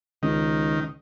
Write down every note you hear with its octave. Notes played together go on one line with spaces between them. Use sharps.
C#2 D#3